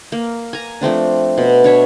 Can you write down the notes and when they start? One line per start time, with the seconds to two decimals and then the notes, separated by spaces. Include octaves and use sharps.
0.12 A#3
0.53 G#5 A#5
0.81 F3 A3 C4 D4
1.38 B2
1.64 D4 C#5 E5